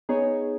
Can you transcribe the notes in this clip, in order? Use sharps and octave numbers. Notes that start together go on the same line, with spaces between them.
B3 D#4 G#4 C#5